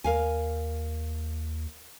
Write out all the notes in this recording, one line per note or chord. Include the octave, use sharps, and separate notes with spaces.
D#2 A#4 F5 G#5